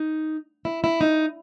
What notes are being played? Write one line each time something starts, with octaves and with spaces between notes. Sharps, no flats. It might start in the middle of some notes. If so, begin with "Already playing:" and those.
Already playing: D#4
E4
E4
D#4